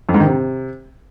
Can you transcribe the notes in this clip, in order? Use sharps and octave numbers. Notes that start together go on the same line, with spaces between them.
F2
G#2
D#3
C3